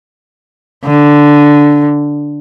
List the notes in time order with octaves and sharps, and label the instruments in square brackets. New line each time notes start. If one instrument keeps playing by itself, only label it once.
[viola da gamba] D3